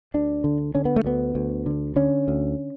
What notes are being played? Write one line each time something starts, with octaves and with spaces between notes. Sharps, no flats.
D2 D4
D3
D3 C#4
B3
A3
D2 B3
D2
D3
D3 C#4
D2